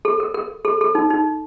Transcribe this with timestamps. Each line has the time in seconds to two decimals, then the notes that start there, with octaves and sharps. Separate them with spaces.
0.05 A4
0.20 A#4
0.34 A#4
0.65 A4
0.81 A4
0.95 D#4
1.10 D#4